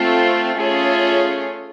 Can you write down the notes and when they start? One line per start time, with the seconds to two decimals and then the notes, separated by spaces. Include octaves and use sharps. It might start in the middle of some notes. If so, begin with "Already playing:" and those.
Already playing: A3 C4 F4
0.59 A3 C#4 F4 G#4 C#5